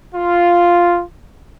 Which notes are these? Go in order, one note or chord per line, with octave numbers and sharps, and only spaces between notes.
F4